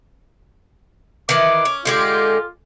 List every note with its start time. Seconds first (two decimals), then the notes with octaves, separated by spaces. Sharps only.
1.29 D#3 E3 D6
1.65 C#4
1.85 D3 G#3 F4 G4